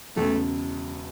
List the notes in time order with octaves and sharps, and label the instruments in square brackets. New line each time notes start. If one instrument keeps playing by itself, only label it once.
[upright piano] E1 E2 C#3 [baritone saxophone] A3